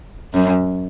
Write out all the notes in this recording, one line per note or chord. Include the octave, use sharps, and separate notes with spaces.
F#2